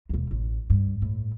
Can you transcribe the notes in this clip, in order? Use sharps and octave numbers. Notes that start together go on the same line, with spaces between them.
E1 D#2
A1
G2
A2